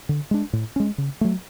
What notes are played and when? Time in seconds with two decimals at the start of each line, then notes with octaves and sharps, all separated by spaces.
0.09 D3
0.31 G#3 D4
0.53 A2
0.76 G#3 C#4
0.98 C#3
1.21 F#3 A3